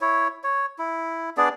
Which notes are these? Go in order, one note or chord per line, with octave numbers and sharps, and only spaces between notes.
E4 C#5
C#5
E4
B3 D4 G#4 D5